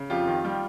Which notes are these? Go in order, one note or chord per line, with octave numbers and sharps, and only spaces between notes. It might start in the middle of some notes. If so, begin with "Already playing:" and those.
Already playing: C#3
F2 F4 G4
D#3
G3